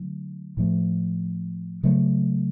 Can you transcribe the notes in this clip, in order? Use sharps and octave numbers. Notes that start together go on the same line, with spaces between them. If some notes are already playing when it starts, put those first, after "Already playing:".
Already playing: D3 F#3 A3
A2 F3 A3
C#3 F#3 A3